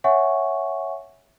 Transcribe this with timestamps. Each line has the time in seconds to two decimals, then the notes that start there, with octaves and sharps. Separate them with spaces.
0.04 C#5 E5 F#5 G#5 C#6